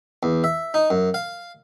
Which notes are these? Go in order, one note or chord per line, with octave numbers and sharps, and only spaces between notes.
E2
E5
D#4
F#2
F5